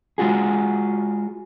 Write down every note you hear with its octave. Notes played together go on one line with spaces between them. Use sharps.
G#3 F4 F#4 G#4